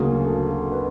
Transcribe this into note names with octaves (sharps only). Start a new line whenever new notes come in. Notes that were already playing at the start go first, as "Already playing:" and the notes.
Already playing: D2 C#3 F#3 A#3 G#4
A4
B4